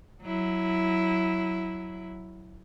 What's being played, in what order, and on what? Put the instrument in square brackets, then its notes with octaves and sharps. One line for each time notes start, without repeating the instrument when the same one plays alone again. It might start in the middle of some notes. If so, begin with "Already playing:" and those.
[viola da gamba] F#3 E4